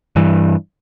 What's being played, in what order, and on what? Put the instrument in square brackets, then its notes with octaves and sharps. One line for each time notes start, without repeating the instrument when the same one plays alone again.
[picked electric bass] G2 E3